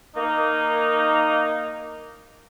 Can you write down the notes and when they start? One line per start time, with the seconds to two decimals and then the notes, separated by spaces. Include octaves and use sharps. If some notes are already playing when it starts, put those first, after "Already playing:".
0.16 A#3 D#4